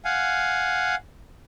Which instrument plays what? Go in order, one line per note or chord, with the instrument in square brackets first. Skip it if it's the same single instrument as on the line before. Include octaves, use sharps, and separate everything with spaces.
[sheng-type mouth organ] F5 F#5 G#5